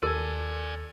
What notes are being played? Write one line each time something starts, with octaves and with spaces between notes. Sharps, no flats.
D#2 A4 A#4 D5 G#5